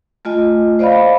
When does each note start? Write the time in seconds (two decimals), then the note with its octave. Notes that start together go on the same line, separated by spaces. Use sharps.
0.25 A3 F4 D#5 G#5
0.79 C5 D5 D#5 F5 B5